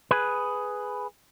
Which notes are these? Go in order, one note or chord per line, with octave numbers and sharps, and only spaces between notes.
G#4 B4